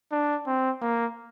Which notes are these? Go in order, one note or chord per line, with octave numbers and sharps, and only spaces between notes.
D4
C4
A#3